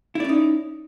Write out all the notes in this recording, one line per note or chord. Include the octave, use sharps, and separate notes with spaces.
C#4 D#4 E4 D5